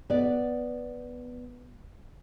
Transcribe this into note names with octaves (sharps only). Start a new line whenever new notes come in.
B3 D5